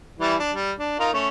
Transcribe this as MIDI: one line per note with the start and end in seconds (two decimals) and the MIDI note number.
0.19 0.35 52
0.19 0.35 55
0.19 0.35 64
0.39 0.52 62
0.53 0.72 55
0.79 0.95 62
0.99 1.10 63
0.99 1.10 65
0.99 1.10 70
1.13 1.29 57
1.13 1.29 61